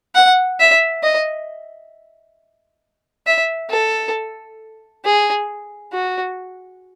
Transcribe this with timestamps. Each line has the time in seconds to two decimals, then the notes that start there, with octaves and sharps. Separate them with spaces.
0.15 F#5
0.60 E5
1.04 D#5
3.27 E5
3.70 A4
5.05 G#4
5.93 F#4